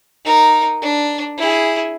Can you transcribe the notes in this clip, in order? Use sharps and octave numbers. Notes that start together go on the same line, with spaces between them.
D#4 A#4
D4
E4 G#4